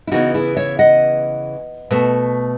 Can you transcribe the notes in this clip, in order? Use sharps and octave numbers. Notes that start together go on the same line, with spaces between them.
E4
C#3 E3 B3 D#4 F#4
E4 G#4
C#5 E5
D#5 F#5
B2 A3